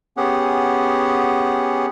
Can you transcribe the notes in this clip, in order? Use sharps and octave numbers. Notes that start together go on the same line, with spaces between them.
B3 C#4 G4 G#4 F#5